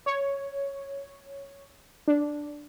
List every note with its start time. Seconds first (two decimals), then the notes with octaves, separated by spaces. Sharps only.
0.06 C#5
2.08 D4